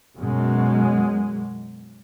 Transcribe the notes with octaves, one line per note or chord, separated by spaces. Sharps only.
F#2 B2 G#3